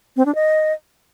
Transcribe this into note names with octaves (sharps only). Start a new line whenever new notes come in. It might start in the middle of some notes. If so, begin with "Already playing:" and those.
C4
D4
D#5